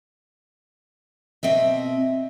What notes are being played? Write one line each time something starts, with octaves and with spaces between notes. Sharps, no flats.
B2 C4 D#5 E5